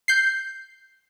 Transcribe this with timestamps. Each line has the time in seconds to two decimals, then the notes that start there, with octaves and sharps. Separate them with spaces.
0.08 G6 C7